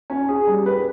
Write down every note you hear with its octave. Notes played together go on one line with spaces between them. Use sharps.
C#4
G#4
G3
B4